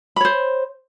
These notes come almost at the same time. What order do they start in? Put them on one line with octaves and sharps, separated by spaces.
B5 C#5 C5